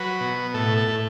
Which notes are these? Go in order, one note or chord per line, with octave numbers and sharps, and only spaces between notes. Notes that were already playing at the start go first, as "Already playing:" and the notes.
Already playing: F#3 B4
B2
A2 A4
A4
A2